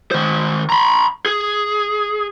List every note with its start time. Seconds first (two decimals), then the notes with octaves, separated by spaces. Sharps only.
0.11 D#3 C5
0.70 A#5 B5
1.26 G#4